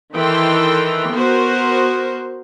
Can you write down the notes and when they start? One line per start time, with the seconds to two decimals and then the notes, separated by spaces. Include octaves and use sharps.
0.13 D#3 E3 A4 G5 C6
1.13 B3 F#4 A#4 C5